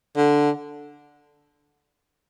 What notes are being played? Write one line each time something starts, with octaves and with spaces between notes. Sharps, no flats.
D3